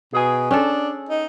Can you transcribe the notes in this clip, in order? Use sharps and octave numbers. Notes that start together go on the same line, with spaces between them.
B2 G#4 G#5
C#4 D4 A4
D#4